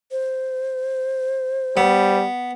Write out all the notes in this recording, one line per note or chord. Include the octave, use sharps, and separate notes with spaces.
C5
G3 B3